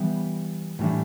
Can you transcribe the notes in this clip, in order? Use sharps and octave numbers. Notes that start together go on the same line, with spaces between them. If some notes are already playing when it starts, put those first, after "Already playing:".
Already playing: E3 G3 B3
A2 E3 G3 D4